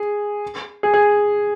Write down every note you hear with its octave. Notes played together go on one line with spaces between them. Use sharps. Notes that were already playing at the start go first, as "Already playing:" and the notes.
Already playing: G#4
G#4
G#4